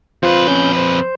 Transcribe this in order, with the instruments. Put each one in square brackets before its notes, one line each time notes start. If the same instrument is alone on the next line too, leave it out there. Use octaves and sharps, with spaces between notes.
[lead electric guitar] F2 B4 [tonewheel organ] F4 C5
[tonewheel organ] C#4 G6
C5